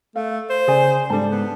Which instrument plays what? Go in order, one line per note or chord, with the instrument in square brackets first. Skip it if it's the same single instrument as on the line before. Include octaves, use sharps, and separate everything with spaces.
[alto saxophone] A3 [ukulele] F5
[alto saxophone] C5
[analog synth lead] C#3 [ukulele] G#4 D5 G#5
[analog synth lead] G#2 [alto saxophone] G3 [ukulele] D4 A4 A5
[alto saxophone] B3